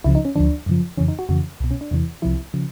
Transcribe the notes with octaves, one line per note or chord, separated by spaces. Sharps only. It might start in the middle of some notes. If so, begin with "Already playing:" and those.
C#2 C#3 F3 E4
D#4
C#4
D2 D3 F3 D4
F#2 C#3 F3
F2 C#3 E3 C#4
D#4
F#4
F2 C#3 E3 F#4
C2 B2
C#4
D4
E2 C3 E3
C2 C3 F3 E4
C#3 F3